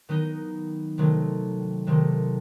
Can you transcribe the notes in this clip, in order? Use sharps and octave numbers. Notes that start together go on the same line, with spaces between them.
D#3 F#3 B3 D#4
C3 D#3 F#3 A3
C3 D#3 F#3 A3